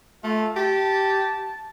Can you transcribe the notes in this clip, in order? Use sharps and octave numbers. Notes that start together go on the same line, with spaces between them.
A3 F4
G4 A5